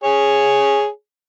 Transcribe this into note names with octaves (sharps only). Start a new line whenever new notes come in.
G#4 C#5